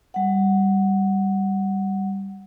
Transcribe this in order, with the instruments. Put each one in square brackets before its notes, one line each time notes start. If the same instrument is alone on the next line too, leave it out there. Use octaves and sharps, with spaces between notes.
[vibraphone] G3 F#5